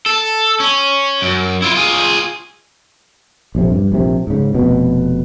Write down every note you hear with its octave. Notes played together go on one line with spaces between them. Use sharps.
A4
C#4
F#2
E4 F4
F4 G#4
A#1 F2 C3
G2
A#1 C3
G#2 C#3
F1 B2